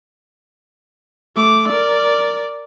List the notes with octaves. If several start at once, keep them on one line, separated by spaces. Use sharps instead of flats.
A3 D6
A#4 D5